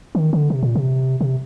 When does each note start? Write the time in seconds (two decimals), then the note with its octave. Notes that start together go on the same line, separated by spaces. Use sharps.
0.15 D#3
0.33 D3
0.50 C3
0.63 A#2
0.75 C3
1.21 C3